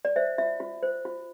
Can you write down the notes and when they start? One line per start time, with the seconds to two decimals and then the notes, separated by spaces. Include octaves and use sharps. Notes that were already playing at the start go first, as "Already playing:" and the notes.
0.05 D5
0.16 C5 E5
0.38 F4 E5
0.60 F4
0.83 C5
1.05 F4